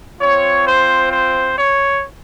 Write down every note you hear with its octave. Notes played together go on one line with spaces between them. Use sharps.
C4 F4 C#5
C5
C5
C#5